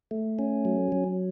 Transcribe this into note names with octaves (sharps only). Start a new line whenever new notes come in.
A3
C#4
F#3
F#3